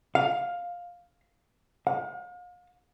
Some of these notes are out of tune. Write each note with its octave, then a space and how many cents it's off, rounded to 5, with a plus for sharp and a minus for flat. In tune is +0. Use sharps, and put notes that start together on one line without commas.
F5 +10
F5 +40